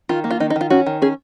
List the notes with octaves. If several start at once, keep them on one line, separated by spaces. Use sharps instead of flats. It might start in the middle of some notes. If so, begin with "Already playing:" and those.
D#3 F4
A#3
F4
D#3 D#4
D#4
D#3 F4
C#4 F#4
D#3
C#4 G#4